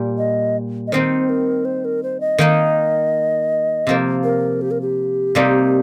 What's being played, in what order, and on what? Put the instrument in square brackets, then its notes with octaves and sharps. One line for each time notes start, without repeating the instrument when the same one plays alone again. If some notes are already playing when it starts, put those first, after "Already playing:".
Already playing: [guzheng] A#2 G3
[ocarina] D#5
D#5
[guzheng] D#3 C4 D#4 [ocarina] C5
[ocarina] A#4
C5
A#4
C5
D#5
[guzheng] D#3 A#3 D#4
C3 F3 A#3
[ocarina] A#4
G4
A#4
G4
[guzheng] C3 G3 A#3 D#4